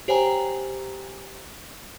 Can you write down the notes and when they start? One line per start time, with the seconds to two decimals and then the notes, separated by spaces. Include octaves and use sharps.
0.08 G4 C5 C#5 G5 G#5 A#5